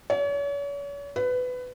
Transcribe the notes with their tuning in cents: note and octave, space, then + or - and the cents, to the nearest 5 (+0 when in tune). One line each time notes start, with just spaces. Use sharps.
C#5 +40
B4 +20